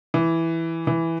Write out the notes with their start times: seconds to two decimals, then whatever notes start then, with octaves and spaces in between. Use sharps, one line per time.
0.14 E3
0.87 E3